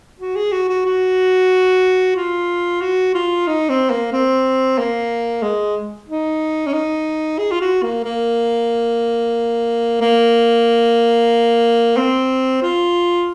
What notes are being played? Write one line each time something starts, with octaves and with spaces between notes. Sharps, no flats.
F#4
G#4
F#4
F#4
F#4
F4
F#4
F4
D#4
C4
A#3
C4
A#3
G#3
D#4
C#4
D#4
G#4
F4
F#4
A#3
A#3
A#3
C4
F4